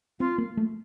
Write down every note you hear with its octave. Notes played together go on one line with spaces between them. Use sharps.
C4 F4
A#3
A3